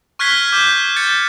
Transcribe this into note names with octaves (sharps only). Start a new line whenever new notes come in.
C#6 F6 F#6 G#6 B6 C7
D6 G6
G6 A6 C#7